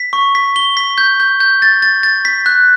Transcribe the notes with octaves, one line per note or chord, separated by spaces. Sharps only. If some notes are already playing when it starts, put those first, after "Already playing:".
Already playing: B6
C#6
B6
G7
B6
G6
G6
G6
A6
A6
A6
B6
F#6